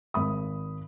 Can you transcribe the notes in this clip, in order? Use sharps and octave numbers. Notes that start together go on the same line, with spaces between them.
G#1 B5 D#6